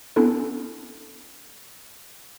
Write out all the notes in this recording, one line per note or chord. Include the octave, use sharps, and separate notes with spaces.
B3 C#4 D4 E4 A4